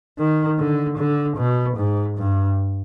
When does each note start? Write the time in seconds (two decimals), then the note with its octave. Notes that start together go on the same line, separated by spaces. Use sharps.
0.18 D#3
0.59 D3
0.98 D3
1.38 B2
1.78 G#2
2.18 G2